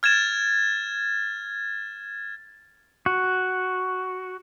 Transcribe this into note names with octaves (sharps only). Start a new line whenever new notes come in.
F6 G#6 A6 E7
F#4